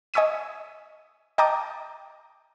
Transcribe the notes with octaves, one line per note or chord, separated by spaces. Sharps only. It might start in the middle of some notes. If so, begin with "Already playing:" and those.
D#5 G#5 C#6 E6 B6 D#7
D#5 G5 A5 A#5 D6 D#6